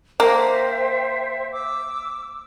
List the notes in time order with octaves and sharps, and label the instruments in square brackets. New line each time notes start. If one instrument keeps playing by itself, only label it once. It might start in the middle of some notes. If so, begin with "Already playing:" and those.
[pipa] A#3 [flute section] C5 E5 G5
[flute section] D6 E6